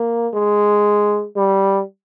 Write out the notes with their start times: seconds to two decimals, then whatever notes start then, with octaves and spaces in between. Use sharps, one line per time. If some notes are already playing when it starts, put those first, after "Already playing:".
Already playing: A#3
0.33 G#3
1.36 G3